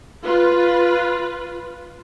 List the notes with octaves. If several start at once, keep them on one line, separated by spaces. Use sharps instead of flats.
F4 B4